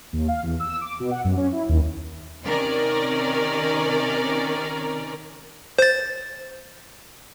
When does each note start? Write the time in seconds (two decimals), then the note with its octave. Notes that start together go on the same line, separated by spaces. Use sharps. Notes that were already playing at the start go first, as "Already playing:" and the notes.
0.13 D#2
0.28 F5
0.43 E2
0.60 E6
0.81 D6
1.00 B2
1.11 F#5
1.24 F#2
1.37 C#4
1.52 E4
1.69 D#2
2.45 C3 D#3 C#4 A#4 D5
5.79 C5 A6